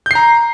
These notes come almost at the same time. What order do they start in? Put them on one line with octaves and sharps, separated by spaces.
G6 C7 A#5